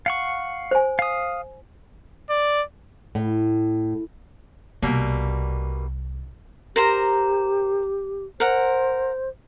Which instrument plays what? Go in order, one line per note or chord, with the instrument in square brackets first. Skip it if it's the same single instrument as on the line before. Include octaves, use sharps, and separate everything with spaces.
[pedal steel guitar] F5 F#5 C#6
[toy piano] C5 G#5
[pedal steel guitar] F5 D#6
[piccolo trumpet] D5
[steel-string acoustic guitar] A2
[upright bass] C2 [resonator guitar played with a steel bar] B2 G3 A#3
[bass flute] G4 [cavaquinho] A#4 C5 A#5
[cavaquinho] A#4 F#5 [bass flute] C5